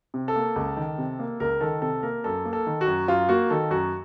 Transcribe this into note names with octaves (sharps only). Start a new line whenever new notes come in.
C3
A4
A#3
C#2
D#3
C3
A#3
C#2 A#4
D#3 A4
C3 A4
A#3 A#4
F#2 A4
A#3
A4
D#3
F#4
F#2
F#2 F4
A#3 F#4
D#3 A4
F#2 F#4